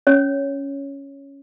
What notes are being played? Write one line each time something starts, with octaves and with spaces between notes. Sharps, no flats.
C#4 C#5